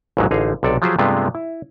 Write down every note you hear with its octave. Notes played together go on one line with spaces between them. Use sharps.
A1 D#2 G#2 D3 F#3 G#3
A1 D3 D#4 G#4 F5
B1 C3 A4 D5
F3 F#3 F4 G4 G#4 C5
G2 C3 G#3 A3 B3 F4
E4